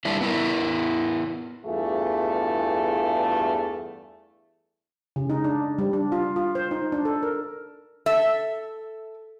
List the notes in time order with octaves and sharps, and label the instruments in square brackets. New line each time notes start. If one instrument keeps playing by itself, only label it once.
[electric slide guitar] G3 A3 D4 E4
B3 E4 A#4
[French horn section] E2 G2 A3 F4 G#4
[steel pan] C#3
D#4
D4
G3
D4
F4
F4
C5
D#4
D4
A4
A#4
[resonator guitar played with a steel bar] A4 E5